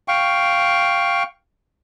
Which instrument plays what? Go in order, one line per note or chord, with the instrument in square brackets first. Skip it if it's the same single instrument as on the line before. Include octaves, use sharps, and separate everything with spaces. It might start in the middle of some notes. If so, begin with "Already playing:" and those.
[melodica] F5 G5 C#6